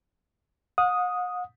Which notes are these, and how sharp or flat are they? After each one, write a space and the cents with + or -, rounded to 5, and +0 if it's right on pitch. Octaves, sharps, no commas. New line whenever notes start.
F#5 -45 D#6 +0